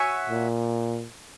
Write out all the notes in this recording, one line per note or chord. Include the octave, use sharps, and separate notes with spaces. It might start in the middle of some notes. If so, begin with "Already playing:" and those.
Already playing: F#4 C#5 E5 G#5
A#2